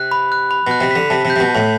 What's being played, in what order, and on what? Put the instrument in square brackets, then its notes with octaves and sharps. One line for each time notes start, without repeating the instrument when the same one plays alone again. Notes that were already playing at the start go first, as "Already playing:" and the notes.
Already playing: [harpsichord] C3 [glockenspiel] F#6
[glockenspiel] B5
F#6
B5
[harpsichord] B2 [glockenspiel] F#6
[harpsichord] C3
[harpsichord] D3 [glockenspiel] B6
[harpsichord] C3 [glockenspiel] A5
[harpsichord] C3
[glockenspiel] G6
[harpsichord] C3
B2
[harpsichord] A2 [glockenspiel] A5